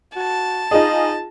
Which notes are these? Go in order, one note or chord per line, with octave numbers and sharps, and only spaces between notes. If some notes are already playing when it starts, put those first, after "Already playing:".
F#4 A5
D#4 F4 G#4 D#5